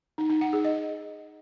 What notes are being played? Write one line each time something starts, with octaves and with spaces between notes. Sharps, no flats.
D#4
D#4
F#5
G#4
D#5